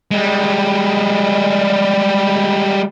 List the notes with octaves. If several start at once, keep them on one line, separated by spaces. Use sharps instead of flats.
G3 G#3